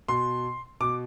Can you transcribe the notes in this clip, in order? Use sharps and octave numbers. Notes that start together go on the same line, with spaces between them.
B2 C6
B2 D6